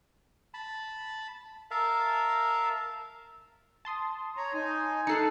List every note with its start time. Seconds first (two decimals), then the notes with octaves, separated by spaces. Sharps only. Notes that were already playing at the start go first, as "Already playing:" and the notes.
0.54 A5 B5
1.71 A#4 E5 F5 A5
3.85 A5 C6 D#6
4.37 C#5 A#5
4.54 D#4 G#5
5.07 D#4 A4 F#6 C7 C#7